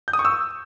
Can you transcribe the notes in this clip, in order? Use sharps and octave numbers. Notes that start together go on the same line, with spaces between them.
G6
D#6
C#6
E6